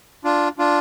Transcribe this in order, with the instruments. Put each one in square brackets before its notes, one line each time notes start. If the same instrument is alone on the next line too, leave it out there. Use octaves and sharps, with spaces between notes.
[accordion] D4 F4
D4 F4